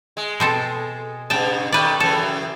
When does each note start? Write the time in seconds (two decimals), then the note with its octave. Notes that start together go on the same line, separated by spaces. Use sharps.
0.17 G#3
0.40 B2 C4 A4
1.30 G2 C#3 G5 A5
1.72 D#3 A3 B4 D5
2.00 F#2 C#3 E3 A4